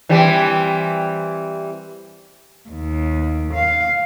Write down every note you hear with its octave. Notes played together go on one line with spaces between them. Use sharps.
E3 G3 C4
D#2
F5